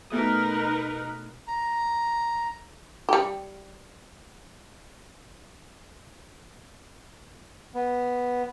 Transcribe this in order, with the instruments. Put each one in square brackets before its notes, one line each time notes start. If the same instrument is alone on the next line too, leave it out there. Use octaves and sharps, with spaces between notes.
[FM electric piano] B2 A3 D#6 [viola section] D#4 A#4 B4
[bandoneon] A#5
[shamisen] G3 G4
[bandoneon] B3